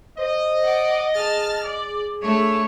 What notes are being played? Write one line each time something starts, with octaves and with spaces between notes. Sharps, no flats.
C5 D#5
D5 F#5
G#4 A5 F6 A6
D5
A3 D4 C#5